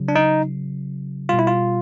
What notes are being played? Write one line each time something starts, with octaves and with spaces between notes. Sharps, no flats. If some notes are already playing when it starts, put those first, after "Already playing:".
Already playing: C#3 F#3
D4
D#4
B2 G3 F4
E4
F4